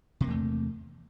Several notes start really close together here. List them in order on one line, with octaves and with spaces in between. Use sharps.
C3 A#3 E2 A3